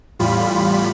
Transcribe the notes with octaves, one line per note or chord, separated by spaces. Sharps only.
E2 A2 G3 F4 B5